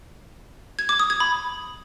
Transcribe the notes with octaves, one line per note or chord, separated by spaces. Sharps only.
G#6
D6
D#6
G#6
B5